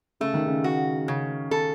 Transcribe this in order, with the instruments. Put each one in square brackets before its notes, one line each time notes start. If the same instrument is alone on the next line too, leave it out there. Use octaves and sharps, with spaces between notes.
[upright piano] C#3 [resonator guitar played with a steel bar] A3
[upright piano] D#3
C#3
[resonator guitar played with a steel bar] F#4
C#3
A4